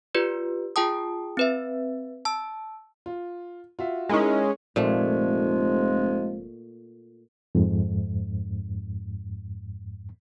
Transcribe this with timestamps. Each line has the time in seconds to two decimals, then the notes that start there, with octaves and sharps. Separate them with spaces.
0.15 F4 G4 B4 D5
0.76 F4 G#4 G5 A5 D#6
1.37 C4 B4 E5
2.25 A5 E6
3.06 F4
3.79 F4 F#4 E5
4.09 G#3 C#4 D#4 E4 A#4
4.76 F1 A#2 F3 G#3 A3
7.55 F2 G#2